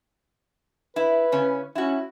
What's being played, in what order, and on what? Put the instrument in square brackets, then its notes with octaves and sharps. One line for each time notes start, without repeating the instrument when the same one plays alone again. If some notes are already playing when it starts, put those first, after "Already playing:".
[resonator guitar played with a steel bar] E4 [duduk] B4
[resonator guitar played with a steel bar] C#3 C#4
[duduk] C#4 [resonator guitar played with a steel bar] E4 F#4